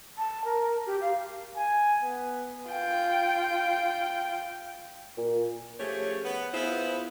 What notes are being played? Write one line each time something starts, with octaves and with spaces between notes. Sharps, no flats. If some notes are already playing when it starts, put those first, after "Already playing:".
A5
A#4
G4
F5
G#5
B3
F4 G5
A#2
F3 A3 C#4 G4 G#4 C#5
B3
B3 E4 F4 G#4 C5